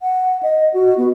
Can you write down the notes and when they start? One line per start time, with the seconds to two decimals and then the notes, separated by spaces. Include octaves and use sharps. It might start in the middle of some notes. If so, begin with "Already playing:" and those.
0.01 F#5
0.43 D#5
0.74 F#4
0.98 B3